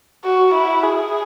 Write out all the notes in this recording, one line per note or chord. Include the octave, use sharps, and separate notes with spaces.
F#4
E4
G#4